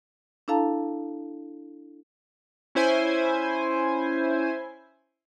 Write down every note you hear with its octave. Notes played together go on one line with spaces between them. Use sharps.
D4 E4 A4 F5 A5 A#5
C#4 E4 C5 G#5